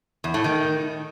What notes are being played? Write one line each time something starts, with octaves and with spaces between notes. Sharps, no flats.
E2
A2
D#3